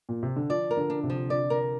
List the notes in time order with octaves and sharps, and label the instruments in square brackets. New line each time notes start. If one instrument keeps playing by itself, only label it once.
[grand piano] A#2
C3
D3
[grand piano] F3 [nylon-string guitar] D5
[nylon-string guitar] A#4
[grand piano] D3
[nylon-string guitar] D4
[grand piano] C3
[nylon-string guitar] F3
D5
A#4